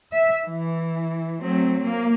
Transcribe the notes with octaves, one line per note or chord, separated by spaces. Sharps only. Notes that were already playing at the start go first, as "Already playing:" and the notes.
E5
E3
F#3 A3 C4
A#3